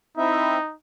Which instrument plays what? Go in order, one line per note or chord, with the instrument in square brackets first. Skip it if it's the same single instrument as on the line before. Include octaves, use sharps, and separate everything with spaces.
[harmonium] C4 E4 E5 [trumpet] D#4